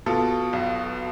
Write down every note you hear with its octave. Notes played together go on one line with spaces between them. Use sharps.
B2 F4 A4
B1